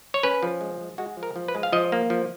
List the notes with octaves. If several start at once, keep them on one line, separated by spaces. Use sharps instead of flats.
C#5
C#4 B4
F3
G#3
G#3
G#3 F#4
F3
A#4
F3
B4
G#3
F5
F3 D#5
A#3
F3